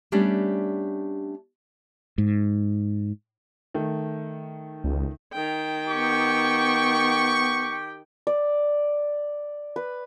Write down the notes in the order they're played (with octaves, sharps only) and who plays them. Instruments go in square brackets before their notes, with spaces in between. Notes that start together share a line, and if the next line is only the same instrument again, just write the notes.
[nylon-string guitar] G3 A3 B3 C#4 D4 G4
[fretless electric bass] G#2
[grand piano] D#3 A3
[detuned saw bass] C#2
[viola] D#3 G5
[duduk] B3 [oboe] G4 [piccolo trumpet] C#6
[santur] D5
B4